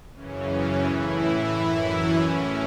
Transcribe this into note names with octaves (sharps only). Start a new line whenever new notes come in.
F#2 C#3 E3 C#4
A2 E3 E4
F#2 E3 E4
C#4
A2 E3 C#4